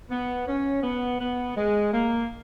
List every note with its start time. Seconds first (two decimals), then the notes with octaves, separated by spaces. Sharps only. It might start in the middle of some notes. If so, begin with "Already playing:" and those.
0.10 B3
0.47 C#4
0.83 B3
1.20 B3
1.56 G#3
1.92 A#3